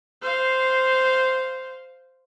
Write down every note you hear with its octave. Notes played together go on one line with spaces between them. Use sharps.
C5 F5